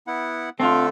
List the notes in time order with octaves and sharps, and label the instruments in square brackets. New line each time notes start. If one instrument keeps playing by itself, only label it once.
[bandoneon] B3 E4 F#5
[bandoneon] D3 A3 A4 [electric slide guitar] C4 F4